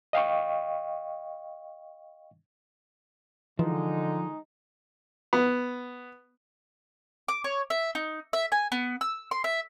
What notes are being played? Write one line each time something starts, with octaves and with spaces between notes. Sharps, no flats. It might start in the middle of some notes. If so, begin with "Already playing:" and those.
D#5 F5 G5 C#6
D3 E3 F3 G#3 D#4
B3
D6
C#5
E5
D#4
E5
G#5
B3
E6
C6
E5